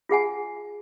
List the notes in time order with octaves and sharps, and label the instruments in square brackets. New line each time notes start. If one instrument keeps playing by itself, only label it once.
[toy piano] F4 G#4 F#5 G#5